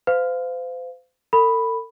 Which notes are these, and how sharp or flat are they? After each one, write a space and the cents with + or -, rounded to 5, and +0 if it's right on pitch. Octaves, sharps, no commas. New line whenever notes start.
C5 -40 F5 +0
A4 +45 B5 +0